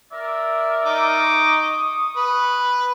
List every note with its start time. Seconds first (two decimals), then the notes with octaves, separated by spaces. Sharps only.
0.12 A#4 D5 E5
0.85 D#4 D6
1.20 C#6 D#6
2.16 B4